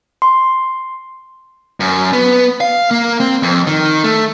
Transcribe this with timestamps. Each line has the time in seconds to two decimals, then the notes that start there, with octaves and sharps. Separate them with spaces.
0.22 C6
1.80 F#2
2.13 B3
2.61 F5
2.91 A#3
3.20 C4
3.43 F2
3.67 D#3
4.04 A3